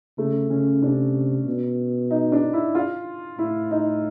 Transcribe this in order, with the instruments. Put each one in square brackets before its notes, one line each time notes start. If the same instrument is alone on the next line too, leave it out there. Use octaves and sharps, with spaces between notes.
[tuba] C#3 [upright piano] A3
[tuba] C#3 [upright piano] C#4
[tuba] C3 [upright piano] D4
[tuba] B2
[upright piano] D#4
D4
E4
F4
[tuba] A2 [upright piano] E4
[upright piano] D#4